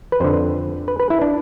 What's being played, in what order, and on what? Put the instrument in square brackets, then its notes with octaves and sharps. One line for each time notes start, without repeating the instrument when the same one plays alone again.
[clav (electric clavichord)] B4
F2 D3 C5
B4
B4
E4
D4